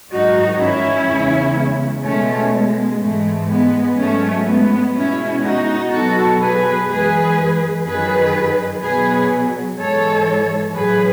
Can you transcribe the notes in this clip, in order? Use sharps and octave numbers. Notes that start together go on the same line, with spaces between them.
G#2 D#3 F#3 D#4 F#4
C#4 E4
E2 C#3 G#3
B2 G#3 A3 C#4
G#3
G#2 E3 G#3 A3
G#3 B3
G#2 F#3 A3 C#4
G#3 B3
B2 G#3 C#4 E4
D#4 F#4
B2 F#3 F#4 A4
G#4 B4
F#2 E3 G#3 G#4 B4
F#2 D#3 F#3 G#4 B4
B2 F#3 G#4 B4
G#2 E3 G#3 A4 C#5
A2 F#3 G#4 B4